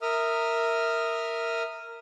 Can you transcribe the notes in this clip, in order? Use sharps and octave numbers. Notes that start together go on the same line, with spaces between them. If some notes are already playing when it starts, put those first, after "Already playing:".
A#4 E5 D#6 F6